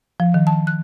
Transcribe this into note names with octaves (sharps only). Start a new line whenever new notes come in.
F3
D#3
A5
F#6